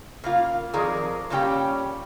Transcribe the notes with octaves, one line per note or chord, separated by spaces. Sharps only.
C#3 A#3 F4
F2 D#3 G#4 A#4 D5 A#5
A#2 C#3 G3 C#4 G4 G5